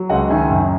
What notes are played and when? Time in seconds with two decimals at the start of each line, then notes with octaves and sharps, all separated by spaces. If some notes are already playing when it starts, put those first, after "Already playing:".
Already playing: F#3
0.09 C#2 D#5 F#5
0.30 D#3 E5 G#5
0.50 F#2